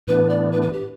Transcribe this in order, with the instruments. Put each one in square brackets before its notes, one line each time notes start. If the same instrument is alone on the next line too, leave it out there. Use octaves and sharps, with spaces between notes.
[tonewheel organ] A2 E3 B3 D4 [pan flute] B4
[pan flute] D5
B4
B4
G4